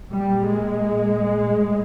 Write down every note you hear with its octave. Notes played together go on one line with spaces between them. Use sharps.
A#2 G3
G#3
A2